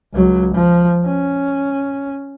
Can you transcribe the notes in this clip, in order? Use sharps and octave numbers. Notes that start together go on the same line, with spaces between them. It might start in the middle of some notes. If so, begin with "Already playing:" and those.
C#2 F#3
F3
C#4